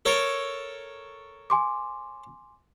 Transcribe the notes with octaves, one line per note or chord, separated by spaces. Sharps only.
A4 A#4 C#5
G#5 C6 D6